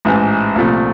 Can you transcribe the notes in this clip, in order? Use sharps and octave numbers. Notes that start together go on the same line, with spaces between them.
A1 G#2 E3
C2 A#2 F3 A3